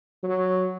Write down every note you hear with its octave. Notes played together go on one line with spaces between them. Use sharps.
F#3